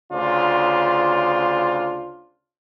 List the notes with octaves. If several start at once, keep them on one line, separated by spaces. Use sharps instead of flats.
D2 C#3 D4 F4 C5